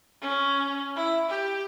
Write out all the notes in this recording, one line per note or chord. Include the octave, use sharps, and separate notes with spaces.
C#4
E4
G4